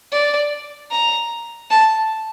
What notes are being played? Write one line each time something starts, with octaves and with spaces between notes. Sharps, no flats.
D5
A#5
A5